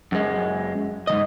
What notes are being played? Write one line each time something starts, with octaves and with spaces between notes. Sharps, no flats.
F#2 G#3
G#2 F3 D#5